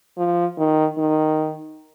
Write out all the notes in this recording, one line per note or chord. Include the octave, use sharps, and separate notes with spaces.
F3
D#3
D#3